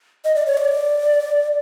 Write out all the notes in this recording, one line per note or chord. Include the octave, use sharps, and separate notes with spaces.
D#5
D5
C#5
D5